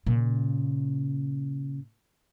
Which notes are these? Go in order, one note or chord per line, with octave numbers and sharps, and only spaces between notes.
A#2 C#3